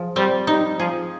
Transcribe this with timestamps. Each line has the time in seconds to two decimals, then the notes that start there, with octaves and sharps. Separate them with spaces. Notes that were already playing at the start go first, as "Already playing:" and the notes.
Already playing: F3 G#4
0.16 G3 C4
0.47 G3 D#4
0.79 F3 G#4